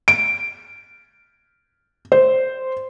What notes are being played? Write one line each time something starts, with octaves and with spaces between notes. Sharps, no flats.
D7
C5